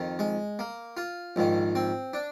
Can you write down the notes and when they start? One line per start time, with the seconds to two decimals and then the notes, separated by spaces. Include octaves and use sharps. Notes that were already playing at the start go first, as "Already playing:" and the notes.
Already playing: F2 D#3
0.19 G#3
0.59 A#3
0.97 F4
1.36 A#1 G#2 D#3
1.75 C4
2.13 D4